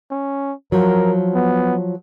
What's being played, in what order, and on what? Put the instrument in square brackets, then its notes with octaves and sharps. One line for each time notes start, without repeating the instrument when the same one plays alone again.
[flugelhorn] C#4
[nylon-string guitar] F3 F#3 [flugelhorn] A#4
[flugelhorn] B3